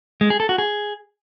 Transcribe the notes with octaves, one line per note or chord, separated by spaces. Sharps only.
G#3
G#4
A4
F#4
G#4